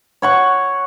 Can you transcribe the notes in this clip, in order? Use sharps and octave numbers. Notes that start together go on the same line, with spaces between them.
C#5 F#5 C#6